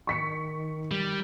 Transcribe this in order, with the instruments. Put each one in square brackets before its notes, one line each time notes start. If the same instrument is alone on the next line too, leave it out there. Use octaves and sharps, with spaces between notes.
[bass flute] D#3 [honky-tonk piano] C#6 B6 C#7
[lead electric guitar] G3